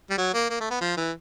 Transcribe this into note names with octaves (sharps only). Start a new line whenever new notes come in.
G3
F#3
A#3
A#3
A3
B3
F3
E3